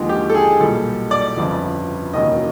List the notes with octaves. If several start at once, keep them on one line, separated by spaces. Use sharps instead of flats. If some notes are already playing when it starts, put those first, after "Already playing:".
Already playing: D#2 D3 F3 G#3
G4
A4
G#4
B1 A#2 G3 A4
D5
G1 F2 C#3
E1 D#2 C#3 F#3 D#5